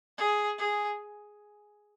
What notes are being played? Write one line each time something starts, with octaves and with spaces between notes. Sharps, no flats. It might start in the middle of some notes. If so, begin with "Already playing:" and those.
G#4
G#4